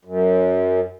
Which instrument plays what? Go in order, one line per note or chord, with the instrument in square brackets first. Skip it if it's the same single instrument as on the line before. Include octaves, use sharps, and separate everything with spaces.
[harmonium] F#2